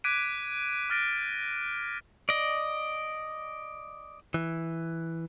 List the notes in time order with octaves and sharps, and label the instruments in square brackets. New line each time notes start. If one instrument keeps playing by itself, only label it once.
[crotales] D6 F#6 G#6 B6 D7 D#7
D6 F6 A6 A#6 D7
[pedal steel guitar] D5 D#5
[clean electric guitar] E3